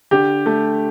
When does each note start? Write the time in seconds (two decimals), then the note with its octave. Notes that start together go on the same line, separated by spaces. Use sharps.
0.11 D3 G4
0.46 A3